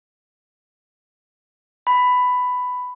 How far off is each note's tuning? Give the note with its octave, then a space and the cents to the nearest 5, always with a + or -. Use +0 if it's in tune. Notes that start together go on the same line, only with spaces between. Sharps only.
B5 +10